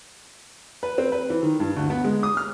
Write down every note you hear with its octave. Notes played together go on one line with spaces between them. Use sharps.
B4
C4
B4
E3
D#3
G2
D2
B3
G#3
D#6
F6